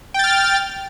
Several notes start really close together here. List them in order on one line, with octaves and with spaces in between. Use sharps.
G5 A6 F6